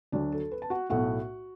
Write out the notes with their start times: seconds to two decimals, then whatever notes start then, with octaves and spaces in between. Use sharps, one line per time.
0.12 D2 D3 F#3 D4 D5
0.32 A4
0.51 B4
0.62 A5
0.70 F#4 F#5
0.90 B1 A2 A3 F#4 F#5